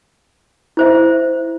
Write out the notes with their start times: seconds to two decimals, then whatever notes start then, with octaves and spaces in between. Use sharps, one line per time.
0.77 E4 C5 E5